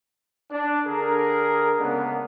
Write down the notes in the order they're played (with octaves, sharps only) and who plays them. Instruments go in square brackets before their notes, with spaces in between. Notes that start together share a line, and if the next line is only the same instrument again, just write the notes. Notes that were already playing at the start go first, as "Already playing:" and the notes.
[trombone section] D4
D3 G#4 A#4
C#3 G#3 A#3 B3 D4